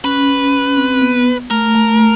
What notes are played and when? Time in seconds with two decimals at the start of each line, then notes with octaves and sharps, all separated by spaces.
0.04 C#4 B4
0.77 C4
1.02 B3
1.51 A3 A#4
1.75 A3
2.00 A3